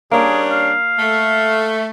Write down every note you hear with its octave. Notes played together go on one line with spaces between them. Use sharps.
G3 A#3 C#4 D4 G#4
F5
A3